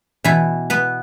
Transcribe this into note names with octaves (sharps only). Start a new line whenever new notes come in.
B2 E3 E4
B3 B4